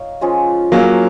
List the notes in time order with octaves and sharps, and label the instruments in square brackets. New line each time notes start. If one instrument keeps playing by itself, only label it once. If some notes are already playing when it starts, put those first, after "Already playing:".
Already playing: [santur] D#4 C#5 F5
F3 G#3 C#4 G#4
[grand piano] F#3 A#3 [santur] C#4 G#4 D#5